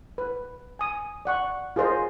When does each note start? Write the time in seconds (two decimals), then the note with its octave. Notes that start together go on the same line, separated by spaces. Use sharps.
0.18 B4
0.79 G#5 D#6
1.25 D5 F#5 C#6
1.76 F4 G#4 A#4 C5 C#5 D#5